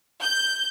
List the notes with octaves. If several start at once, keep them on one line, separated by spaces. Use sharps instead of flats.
G6